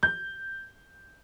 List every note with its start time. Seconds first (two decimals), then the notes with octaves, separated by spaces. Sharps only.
0.03 G6